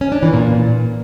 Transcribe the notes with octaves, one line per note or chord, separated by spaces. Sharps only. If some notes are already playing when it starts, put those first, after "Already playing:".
C#4
D4
E3
A#2